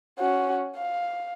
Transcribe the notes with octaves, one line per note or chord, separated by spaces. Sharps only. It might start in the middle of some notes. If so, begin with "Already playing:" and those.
C#4 F#4
F5